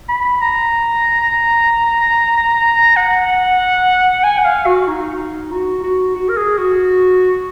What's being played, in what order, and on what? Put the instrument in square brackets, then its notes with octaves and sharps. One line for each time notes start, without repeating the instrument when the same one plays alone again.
[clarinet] B5
A#5
F#5
G#5
F#5
F5
F#4
D#4
F#4
F#4
F#4
A#4
G#4
F#4